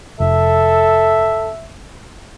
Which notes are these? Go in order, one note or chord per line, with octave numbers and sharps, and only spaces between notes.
F1 A4 E5